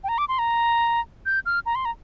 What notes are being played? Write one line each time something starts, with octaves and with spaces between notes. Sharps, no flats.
G5
A#5
D6
C6
A#5
G6
F6
A#5
C6
A#5